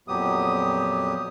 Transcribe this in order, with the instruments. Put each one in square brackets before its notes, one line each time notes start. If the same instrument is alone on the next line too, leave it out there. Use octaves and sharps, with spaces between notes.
[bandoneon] F2 A#2 F#3 B3 G4 D#6